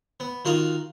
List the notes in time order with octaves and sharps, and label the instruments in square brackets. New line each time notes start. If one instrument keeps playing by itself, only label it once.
[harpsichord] B3
D#3 F4 F#4 D#5